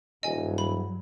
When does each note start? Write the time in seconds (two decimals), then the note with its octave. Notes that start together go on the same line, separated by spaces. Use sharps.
0.23 D#1 G2 F#3 D#5 G#5
0.58 B5